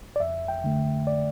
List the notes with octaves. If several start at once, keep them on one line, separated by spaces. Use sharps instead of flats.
D5
F2 E5
G5
D3 A3
D5